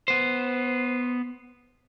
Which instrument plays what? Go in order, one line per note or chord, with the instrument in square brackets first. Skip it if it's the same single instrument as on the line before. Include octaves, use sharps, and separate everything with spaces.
[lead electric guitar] B3 C5